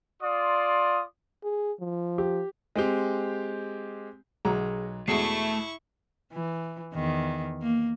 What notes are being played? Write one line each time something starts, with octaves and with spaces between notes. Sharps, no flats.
F4 D5 C6 D#6
G#4
F3
G4
G#3 C4 G4
B1 F#3 G#4 A#5
E2 B2 G#3 A3 E4 A4 C#6 C7
E3
E2 D#3
A#3